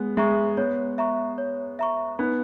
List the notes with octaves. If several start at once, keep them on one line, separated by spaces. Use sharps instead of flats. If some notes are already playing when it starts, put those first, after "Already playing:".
Already playing: G#3 B3
G#3 E5 A#5 C#6
B3 C#5
E5 A#5 C#6
C#5
E5 A#5 C#6
B3 D#4